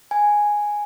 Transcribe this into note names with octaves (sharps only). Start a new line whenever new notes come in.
G#5